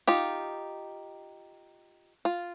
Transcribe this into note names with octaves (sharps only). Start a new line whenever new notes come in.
D#4 F4 G4
F4